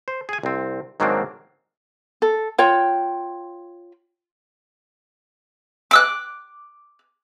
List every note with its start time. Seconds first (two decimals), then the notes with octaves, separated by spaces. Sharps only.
0.08 C5
0.29 G#4 G#5
0.43 C2 C4
1.00 G#2 D#3 F#3 A#3 C4 D4
2.22 A4
2.58 F4 C#5 G5
5.91 D6 E6 F#6